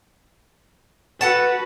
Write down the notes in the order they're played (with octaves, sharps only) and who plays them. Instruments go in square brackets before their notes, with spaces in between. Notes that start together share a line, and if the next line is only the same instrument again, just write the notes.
[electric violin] F#4 B4 [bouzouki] A4 F#5 A5